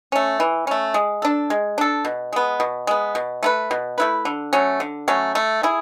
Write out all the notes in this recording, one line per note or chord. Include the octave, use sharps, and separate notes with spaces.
A3 C#4
E3
A3 C#4
G#3
D4 A4
G#3
D4 A4
B2
G#3 B3
B2
G#3 B3
B2
A3 E4 B4
B2
A3 E4 B4
D3
F#3 A3 C#4
D3
F#3 A3 C#4
A3
E4 G#4